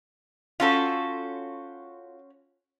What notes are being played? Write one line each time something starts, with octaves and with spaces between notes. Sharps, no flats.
C#4 F4 F#4 A4 C5